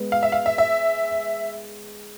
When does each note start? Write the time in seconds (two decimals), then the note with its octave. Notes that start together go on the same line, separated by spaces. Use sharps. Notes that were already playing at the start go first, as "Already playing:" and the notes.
Already playing: G#3 B3
0.12 F5
0.23 E5
0.32 F5
0.46 E5
0.58 E5